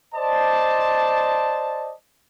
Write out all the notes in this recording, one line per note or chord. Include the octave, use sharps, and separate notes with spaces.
C5 D5 D#5 A5